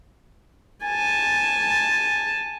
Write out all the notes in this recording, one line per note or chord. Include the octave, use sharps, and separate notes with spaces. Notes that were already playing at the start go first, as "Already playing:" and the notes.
G#5 A5